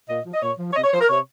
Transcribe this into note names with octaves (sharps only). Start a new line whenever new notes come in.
A#2 D#5
F3
D#5
A#2 C#5
F3
C#5
C3 D#5
C#5
F3 C5
A#4
C3 C#5